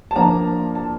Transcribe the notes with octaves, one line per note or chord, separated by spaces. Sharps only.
A5
F3 A#3 D4 F4 A#5
A5